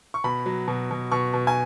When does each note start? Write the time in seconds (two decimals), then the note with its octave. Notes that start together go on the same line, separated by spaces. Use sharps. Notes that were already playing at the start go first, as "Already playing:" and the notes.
0.14 C#6
0.24 B2 B5
0.46 F#3
0.68 B2
0.91 B2
1.12 B2 C#6
1.34 B2
1.47 G#5